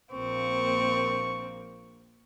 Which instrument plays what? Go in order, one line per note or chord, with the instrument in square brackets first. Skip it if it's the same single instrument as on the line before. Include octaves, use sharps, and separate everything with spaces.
[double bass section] A#1 A#3 [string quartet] C4 [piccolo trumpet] C#6